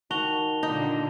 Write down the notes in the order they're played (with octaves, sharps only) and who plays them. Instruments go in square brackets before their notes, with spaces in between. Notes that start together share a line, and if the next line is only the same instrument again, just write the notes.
[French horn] D#3 [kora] F#4 [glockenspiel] A5 F7 G7
[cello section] A#2 D3 A#3 [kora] D#4